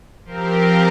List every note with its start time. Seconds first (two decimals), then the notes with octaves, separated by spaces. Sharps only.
0.24 F3 C4 G4 A#4